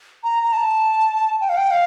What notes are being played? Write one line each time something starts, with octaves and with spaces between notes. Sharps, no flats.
A#5
A#5
A5
G5
F5
G5
F5